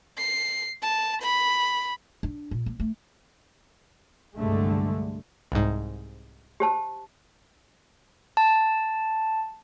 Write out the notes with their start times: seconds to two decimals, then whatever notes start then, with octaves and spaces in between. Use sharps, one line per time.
0.17 C7
0.82 A5
1.22 B5
2.23 D4
2.51 A#2
2.66 A#3
2.80 A3
4.35 C2 G2 D3 G#3 A3
5.52 C2 G#2
6.60 G4 C5 A5
8.37 A5